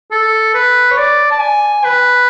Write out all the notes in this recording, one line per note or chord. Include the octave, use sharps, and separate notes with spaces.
A4
B4
C#5
D5
A5
G#5
B4